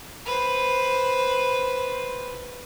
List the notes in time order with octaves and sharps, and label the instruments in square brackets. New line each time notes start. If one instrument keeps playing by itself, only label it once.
[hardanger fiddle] B4 C5